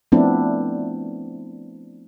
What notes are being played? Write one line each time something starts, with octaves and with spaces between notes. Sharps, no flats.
F3 A3 B3 C4 D4 E4